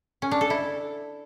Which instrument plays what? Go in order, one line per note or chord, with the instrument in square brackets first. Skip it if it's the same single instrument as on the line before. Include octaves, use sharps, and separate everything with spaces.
[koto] C#4
D4
A4
E4